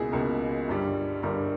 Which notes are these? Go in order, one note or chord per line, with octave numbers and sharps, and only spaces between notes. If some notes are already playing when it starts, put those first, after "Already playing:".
Already playing: C#2 B2 A#3 E4 G#4
C#2 B2 A#3 A#4
G1 G2 G3
G1 G2 G3 A#4